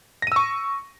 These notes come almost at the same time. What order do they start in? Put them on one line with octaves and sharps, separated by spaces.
A#6 D#7 E6 C#6